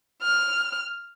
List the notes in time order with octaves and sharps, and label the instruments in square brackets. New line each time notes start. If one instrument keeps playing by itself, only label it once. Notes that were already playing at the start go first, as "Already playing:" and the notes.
[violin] F6